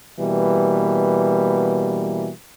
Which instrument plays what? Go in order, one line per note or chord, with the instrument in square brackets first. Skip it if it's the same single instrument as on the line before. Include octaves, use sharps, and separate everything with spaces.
[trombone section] B2 E3 G3 A#3